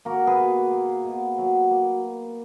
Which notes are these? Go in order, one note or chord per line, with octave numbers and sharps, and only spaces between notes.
A#3 F#4 A#4
G#4 B4
B2
A#3
B2
F#3
A#3